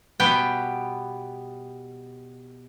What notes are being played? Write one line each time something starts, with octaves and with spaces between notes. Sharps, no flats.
B2 G3 B3 G4 G5 G#5